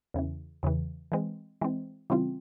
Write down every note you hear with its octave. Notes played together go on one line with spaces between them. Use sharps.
E2 C#3 E3
E2 C#3 E3
E3 G#3 C4
E3 G#3 C4
C#3 E3 G3 C4 F4